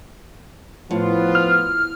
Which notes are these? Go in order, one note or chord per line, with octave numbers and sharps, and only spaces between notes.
A2 F3 B3 F4
F6